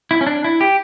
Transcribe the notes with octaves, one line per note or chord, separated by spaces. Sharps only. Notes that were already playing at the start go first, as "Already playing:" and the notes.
E4
C#4
D4
E4
G4